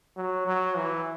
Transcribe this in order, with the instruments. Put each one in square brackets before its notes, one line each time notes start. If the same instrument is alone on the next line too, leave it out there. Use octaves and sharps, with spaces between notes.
[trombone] F#3
F#3
E3